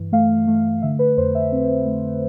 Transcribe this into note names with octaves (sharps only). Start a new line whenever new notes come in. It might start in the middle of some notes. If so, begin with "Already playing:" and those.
Already playing: G2 E3
A3 F5
A3
D3 E5
B4
F2 C5
E5
C4
A3